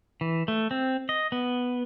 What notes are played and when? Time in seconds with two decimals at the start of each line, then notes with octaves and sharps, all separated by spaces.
0.21 E3
0.48 A3
0.71 C4
1.09 D#5
1.32 B3